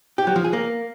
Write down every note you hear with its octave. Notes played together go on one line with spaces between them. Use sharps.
G4
F#3
F3
G#4
A#3